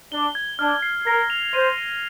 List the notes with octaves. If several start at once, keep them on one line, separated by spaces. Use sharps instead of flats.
D4 G7
G#6
D4 F6
C7
A#4 A#6
F7
C5 D#7
D#7